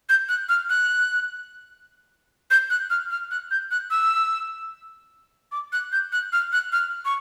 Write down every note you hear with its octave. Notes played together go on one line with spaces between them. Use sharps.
G6
F#6
F6
F#6
G6
F#6
F6
F6
F#6
G6
F#6
E6
D6
F#6
G6
F#6
F6
F#6
F6
C#6